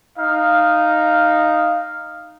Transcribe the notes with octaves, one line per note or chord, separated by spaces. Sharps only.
D#4 F5